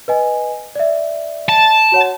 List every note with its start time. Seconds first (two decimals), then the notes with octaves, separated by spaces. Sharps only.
0.08 B4 D#5 G#5
0.75 D5 E5
1.49 A5
1.92 F#4 C#5 F#5